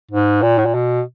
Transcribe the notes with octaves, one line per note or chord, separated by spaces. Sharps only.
G#2
A#2
A2
A#2
B2